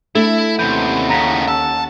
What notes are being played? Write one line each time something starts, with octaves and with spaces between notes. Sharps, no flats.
A3 D4 E4 A4
D#2 C3 E3 C#4 F#5 G6
A2 C#3 A#5 A#6 B6
A5 E6